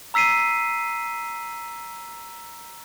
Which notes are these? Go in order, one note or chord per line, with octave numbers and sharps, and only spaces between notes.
A#5 E6 B6 C7 D#7